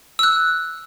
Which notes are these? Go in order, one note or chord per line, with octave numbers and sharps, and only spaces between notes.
E6 F#6